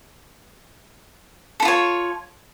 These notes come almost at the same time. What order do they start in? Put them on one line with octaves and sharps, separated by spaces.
A4 E4 F4 C#5